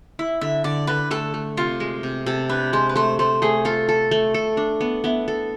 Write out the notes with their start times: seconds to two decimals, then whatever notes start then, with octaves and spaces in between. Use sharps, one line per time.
0.19 E4 E5
0.41 D3 E5
0.64 D3 D5
0.87 D3 B4
1.11 A3 A4
1.34 A3
1.57 C3 F4
1.80 G#3
2.03 C3
2.26 C3 A4
2.49 D4 B4
2.73 G#3 C5
2.89 B4
2.96 A3 C5
3.19 A3 C5
3.42 A3 G#4
3.65 F4 A4
3.89 A4
4.11 A3
4.34 A4
4.57 D4
4.81 B3
5.04 B3 E4
5.28 A4